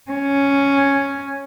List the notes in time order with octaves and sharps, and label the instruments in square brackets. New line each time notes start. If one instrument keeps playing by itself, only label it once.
[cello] C#4